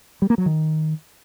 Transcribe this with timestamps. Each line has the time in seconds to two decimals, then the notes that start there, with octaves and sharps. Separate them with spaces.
0.22 G3
0.30 A#3
0.38 F#3
0.46 D#3